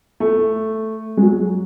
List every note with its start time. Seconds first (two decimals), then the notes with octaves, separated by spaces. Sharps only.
0.20 A3
1.17 G#3
1.22 F#3